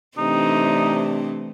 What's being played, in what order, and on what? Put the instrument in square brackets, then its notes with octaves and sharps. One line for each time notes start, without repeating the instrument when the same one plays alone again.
[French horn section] C3 D4 [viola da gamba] E3 A3 C4 [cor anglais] D#4